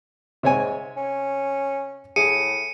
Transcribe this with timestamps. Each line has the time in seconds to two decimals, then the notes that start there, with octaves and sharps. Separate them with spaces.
0.43 G#2 C3 C#5 G#5
0.97 C#4
2.16 A2 G#4 C#7 D#7